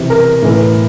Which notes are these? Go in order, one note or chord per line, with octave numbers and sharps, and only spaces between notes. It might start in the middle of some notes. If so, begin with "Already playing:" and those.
Already playing: C3 E3
A#4
A2 E3